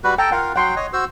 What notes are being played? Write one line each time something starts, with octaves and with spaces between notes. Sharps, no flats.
G3 F#4 B4
A4 G5 A5 A#5
F4 A#4 F5 F#5
F#3 F#5 G5 C6
C#5 D#5
F#4 C5 E6